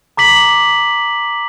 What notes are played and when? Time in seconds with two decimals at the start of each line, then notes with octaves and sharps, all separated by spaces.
0.17 A#5 D6 B6 F#7